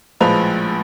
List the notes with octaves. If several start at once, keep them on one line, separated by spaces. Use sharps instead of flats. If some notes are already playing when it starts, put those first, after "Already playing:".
A#1 A2 F3 G#3 B4 F7